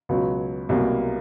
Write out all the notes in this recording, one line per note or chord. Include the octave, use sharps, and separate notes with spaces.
C#2 B2 F#3
C2 B2 F#3 A#3